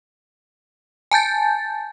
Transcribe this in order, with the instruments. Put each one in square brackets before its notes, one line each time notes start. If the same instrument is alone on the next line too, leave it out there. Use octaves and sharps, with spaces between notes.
[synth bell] G#5 A5 G6 A6